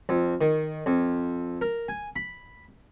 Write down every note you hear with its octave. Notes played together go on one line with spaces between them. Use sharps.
F2
D#3
F2
A#4
G#5
B5